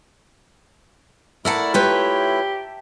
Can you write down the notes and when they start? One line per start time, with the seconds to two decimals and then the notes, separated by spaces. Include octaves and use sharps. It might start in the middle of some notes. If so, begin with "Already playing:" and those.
1.45 A3 E4 A#4 D5 E5 F#5 A5 A#5
1.74 F4 G4 B4 C#5 G5